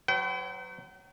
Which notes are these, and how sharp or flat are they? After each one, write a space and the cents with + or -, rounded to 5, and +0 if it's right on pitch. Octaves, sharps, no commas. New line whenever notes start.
F#3 +0 B4 +45 G5 -40